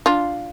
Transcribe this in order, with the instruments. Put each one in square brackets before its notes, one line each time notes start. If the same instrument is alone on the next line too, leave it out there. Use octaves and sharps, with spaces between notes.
[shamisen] D4 F4